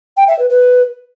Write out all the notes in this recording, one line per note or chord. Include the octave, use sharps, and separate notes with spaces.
G5
E5
B4
B4